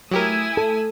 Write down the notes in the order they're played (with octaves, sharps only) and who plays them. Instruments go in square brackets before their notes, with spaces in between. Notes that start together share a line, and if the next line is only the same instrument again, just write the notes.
[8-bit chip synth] F#3 G4 A#4 [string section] A3 D#6 E6 [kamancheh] E4 G#5
[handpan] A4